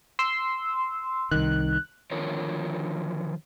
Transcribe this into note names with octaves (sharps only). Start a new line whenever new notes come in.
C6 E6
C2 D#3 F#6
D3 D#3 F3 A#4 C#5